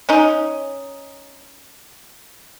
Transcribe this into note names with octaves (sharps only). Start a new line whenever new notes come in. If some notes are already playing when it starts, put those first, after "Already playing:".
C#4 D#4